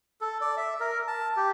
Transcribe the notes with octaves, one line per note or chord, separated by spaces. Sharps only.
A4
D5
E5
A#4
A5
G4